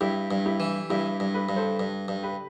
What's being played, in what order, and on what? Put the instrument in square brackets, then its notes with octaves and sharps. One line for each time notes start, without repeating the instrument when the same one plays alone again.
[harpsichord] G2 [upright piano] E4 G4
[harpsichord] G2
[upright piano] E4 G4
[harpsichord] E3
[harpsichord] G2 [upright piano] E4 G4
[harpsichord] G2
[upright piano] G4 B4
[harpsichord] G2
[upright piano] A4 C5
[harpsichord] G2
G2
[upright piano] G4 B4